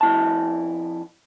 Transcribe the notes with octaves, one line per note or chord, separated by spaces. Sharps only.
F2 E4 A5